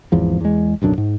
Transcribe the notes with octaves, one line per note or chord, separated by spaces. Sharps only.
G#1 E2 F3
E2 G#3
D1 B1 F#2 D4
G#2